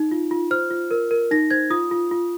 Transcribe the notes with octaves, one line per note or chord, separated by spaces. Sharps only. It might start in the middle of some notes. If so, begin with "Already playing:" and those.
Already playing: D#4
F4
F4
C5 F6
F4
A#4
A#4
D#4 A#6
C5 G#6
F4 D#6
F4
F4